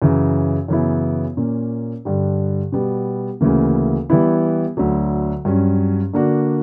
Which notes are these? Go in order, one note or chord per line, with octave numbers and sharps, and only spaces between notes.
F#2 C#3 E3
F#2 C#3 E3 B3 E4
A#2 A#3 C#4
G2 D3 G3
B2 G3 B3
D2 C#3 E3 A#3
E3 G3 B3 E4
D2 D3 F#3
G2 F#3 C#4
D3 A#3 D4 F#4